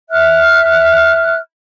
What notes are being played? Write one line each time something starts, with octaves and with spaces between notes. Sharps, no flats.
E5 F6 F#6